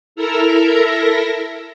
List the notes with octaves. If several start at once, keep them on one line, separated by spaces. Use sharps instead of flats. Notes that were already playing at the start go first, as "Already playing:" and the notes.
E4 A4 A#4 E5 A#5